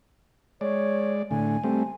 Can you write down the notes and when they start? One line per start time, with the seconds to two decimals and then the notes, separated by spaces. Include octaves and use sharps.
0.61 G#3 C#5 D5
1.31 A2 D3 G#5
1.64 G3 A3 C4